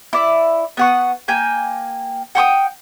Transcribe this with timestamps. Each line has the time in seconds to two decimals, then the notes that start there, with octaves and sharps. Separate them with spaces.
0.13 E4 D5
0.77 B3 F#5 C#6
1.28 A#3 G5 G#5 G6
2.35 F#5 G5 C#6 D#6